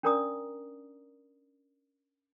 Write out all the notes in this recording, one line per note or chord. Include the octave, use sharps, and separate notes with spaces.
C#4 D4 A#4 D5 A#5 D#6